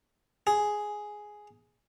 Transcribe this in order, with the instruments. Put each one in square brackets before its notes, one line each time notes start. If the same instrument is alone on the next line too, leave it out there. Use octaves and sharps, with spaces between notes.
[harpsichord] G#4